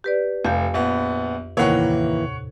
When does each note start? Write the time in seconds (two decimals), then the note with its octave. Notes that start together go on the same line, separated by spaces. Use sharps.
0.04 G4 B4 D5
0.45 F1 F2 F5 G6
0.74 A#1 B3
1.57 D#2 A2 C3 D#3 E3 A#3 C#5 F#5